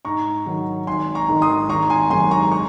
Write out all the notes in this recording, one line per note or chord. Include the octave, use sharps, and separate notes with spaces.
G#2 A#5 C#6
D#3 F#3
G#1 G#5 C6
A#5 C#6
G#2 D#3 G#3
C6 D#6
G#1 A#5 C#6
G#5 C6
F#2 D#3 G#3 G#5 C6
A#5 C#6
A#5 C#6